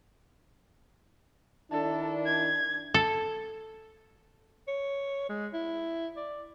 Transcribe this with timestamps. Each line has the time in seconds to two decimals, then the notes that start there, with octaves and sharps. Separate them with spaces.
1.72 D#3 D4 E4 A4
2.26 G#6
2.94 A4
4.68 C#5
5.29 G#3
5.53 E4
6.16 D5